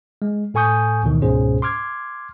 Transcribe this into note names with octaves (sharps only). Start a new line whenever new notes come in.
G#3
A2 A4 G#5 C#6 D#6 G6
D2 B2 D#3 E3
C#2 G#2 B2 C#4 G#4 C5
C6 D6 F6 G#6